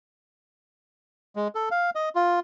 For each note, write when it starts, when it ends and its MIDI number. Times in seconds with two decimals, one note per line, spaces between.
1.36 1.48 56
1.55 1.69 69
1.71 1.90 77
1.95 2.09 75
2.15 2.40 65